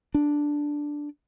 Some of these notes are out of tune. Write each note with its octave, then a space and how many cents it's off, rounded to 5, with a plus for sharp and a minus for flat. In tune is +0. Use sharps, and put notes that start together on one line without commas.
D4 +0